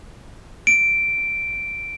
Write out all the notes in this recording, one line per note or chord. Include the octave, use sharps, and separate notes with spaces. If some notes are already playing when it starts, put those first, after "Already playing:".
D7